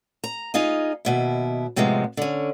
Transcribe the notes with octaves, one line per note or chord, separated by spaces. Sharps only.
A#5
D#4 F4 G#4 D#5
D#2 B2 E4
A2 C3 F3 G#3 B3
D3 C#4